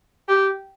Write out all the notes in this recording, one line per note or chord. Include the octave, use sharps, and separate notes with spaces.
G4